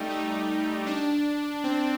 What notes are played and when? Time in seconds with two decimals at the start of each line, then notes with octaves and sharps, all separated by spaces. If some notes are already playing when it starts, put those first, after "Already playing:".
Already playing: G3 A3 D#4 G4
0.10 D#4
0.87 D4
1.64 C4